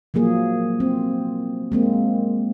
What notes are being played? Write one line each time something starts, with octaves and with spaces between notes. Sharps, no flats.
F3 F#3 A#3 G#4
C4
G#3 A#3 C4